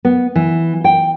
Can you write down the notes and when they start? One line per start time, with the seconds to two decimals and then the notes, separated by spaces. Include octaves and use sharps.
0.05 B3
0.35 E3
0.84 G5